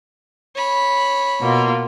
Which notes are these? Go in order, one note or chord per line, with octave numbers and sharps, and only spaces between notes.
C#5 B5
B2 A#3 F4